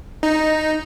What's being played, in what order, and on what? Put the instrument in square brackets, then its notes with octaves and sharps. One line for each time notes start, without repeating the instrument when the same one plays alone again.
[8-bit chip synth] D#4